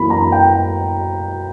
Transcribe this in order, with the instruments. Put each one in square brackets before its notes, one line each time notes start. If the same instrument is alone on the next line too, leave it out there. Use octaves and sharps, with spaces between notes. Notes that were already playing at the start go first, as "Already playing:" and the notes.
Already playing: [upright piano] F#2 E3 A#3 B5
A#5
G5